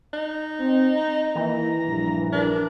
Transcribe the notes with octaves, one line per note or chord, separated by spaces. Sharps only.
D#4
C4
A#5
D#3 E3 A#3 E4
A#1 G2
D4 A#4